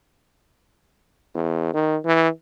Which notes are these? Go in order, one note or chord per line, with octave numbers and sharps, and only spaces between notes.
E2
D#3
E3